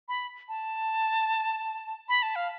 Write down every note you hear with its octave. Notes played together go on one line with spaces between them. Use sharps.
B5
A5
B5
A5
F5